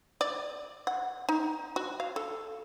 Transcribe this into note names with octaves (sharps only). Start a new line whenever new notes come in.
D5
F#5
D#4
F#4
F5
A4